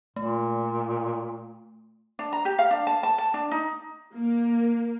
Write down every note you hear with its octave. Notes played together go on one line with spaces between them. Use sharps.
A#2 A3
D4
A#5
G4
F5
D4
A5
A5
A5
D4
D#4
A#3